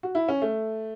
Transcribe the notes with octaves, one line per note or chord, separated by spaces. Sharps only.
F#4
E4
C#4
A3